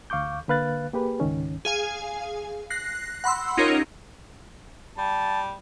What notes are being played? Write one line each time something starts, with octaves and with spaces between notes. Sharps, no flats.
D2 F5 C#6 D6 G6
D3 A#3 B4 F5 F#6 A6
A#3 G4 G#4 B4
C#2 G#2 D#3 C#4
G#4 F5 G#5
F#6 A#6 C7
F#5 B5 C6 E6
C#4 D#4 F4 G4 A#4 C#5
G3 A5